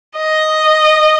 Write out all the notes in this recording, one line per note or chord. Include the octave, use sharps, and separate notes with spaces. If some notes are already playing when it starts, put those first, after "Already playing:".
D#5